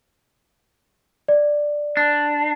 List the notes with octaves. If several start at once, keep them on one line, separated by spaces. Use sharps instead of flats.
D5
D4